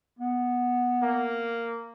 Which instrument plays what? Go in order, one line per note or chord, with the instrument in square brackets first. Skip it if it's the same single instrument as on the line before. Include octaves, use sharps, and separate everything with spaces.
[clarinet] B3
[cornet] A#3